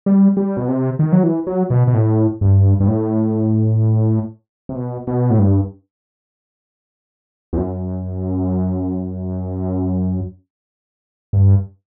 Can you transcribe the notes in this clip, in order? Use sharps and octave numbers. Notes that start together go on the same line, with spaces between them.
G3
G3
B2
C3
D#3
F#3
E3
F#3
B2
B2
A2
G2
G2
A2
C3
B2
B2
A2
G2
E2
F#2
G2